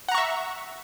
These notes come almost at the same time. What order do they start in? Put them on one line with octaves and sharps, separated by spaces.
F#5 A#5 C#6 E5